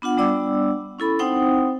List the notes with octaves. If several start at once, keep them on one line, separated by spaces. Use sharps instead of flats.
B3 D4 F4 F#5
G3 B3 D4 D5 D6 E6
C#4 E4 A4 B5 C#6
C4 D#4 C5 F#5 G5 D#6